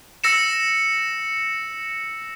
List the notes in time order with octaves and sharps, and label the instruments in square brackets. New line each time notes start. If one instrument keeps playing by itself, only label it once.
[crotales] E6 A#6 C#7 E7